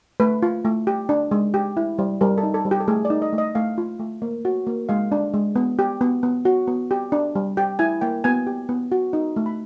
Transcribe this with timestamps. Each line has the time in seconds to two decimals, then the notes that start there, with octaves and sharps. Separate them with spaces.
0.20 A3 B4
0.43 F4
0.65 A3
0.87 G4
1.09 D4
1.31 G#3
1.54 G4
1.77 E4
1.99 G3
2.21 G3 A#4
2.38 A4
2.43 D#4
2.54 A4
2.65 G3
2.71 G4
2.80 A4
2.88 A3 G#4
3.05 D5
3.10 D#4
3.22 D#5
3.33 A3
3.38 D#5
3.55 A3 F5
3.78 F4
4.00 A3
4.22 A#3
4.45 F#4
4.67 A#3
4.89 G#3 F5
5.12 D4
5.34 G#3
5.56 B3
5.79 G4
6.01 B3
6.23 B3
6.45 F#4
6.68 B3
6.91 G4
7.12 D4
7.35 G3
7.57 G4 G5
7.79 E4 G#5
8.01 A#3 G5
8.24 B3 G#5
8.47 G4
8.69 B3
8.92 F#4
9.13 D#4
9.36 A3
9.46 B5